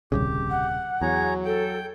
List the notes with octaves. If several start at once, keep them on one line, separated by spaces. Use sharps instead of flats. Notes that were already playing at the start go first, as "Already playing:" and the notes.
D#1 C2 C#3 G4
F#5
E2 F#3 G#4 C#5 A#5
A4 G5